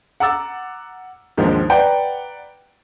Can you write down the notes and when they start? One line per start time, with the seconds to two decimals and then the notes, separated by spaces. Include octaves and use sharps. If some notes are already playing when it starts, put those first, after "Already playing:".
0.20 F#5 A#5 D6 E6 A6
1.37 D#2 G#2 D3 D#3 F3 G#3
1.70 B4 D5 F#5 G5 A#5